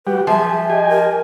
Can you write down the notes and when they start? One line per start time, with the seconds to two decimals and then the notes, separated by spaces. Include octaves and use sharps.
0.07 G3 F#4 G4 B4
0.27 F3 G#4 E5
0.70 G4 D#5 G#5
0.90 A#4